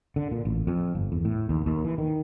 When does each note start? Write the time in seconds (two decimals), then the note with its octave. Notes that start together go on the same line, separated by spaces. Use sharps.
0.16 D3
0.31 A#2
0.45 A1
0.67 F2
0.95 G1
1.12 E2
1.25 A2
1.49 D#2
1.66 D#2
1.85 E3
1.98 D#3